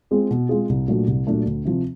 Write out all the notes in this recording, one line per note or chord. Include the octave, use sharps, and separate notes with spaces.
G#3 C4 F4 G#4
B2
G#3 C4 F4 G#4
C2
A#2 F#3 A3 D4
C2
A#2 F#3 A3 D4
D2
C3 F3